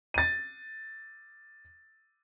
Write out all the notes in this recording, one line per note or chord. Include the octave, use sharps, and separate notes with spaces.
A6 D#7